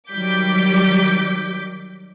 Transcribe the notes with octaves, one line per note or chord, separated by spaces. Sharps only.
D#3 F#3 G3 D6 G6 B6